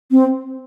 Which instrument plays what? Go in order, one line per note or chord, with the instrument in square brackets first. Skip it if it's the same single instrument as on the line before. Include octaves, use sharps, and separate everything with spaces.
[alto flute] C4